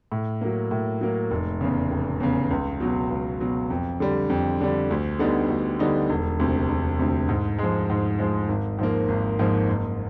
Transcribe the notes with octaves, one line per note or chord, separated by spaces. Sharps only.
A2
F#3 A#3
A2
F#3 A#3
F1
E2 C#3
F1
E2 C#3
C#2
B2 F#3
C#2
B2 F#3
F2
D3 G3
F2
D3 G3
D2
D3 G3 B3 D#4
D2
D3 G3 B3 D#4
E1
D2 C3
E1
D2 C3
G#2
F3 G#3
G#2
F3 G#3
G#1
G#2 F3 A#3
G#1
G#2 F3 A#3
F#1